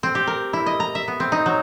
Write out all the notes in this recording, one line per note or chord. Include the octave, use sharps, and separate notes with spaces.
C4
G4
A#4
E4
D#5
A#5
E5
B3
C4
D#4
F#3